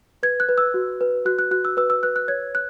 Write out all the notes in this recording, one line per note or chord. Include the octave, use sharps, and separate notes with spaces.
B4 G#6
F#6
B4
E6
F#4
B4
F#4 F#6
F#6
F#4 F#6
E6
B4 E6
E6
B4 F#6
F#6
C#5 G#6
F#6